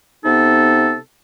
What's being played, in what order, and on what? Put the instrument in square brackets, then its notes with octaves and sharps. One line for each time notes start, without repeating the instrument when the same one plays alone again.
[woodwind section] C3 B3 D#4 A4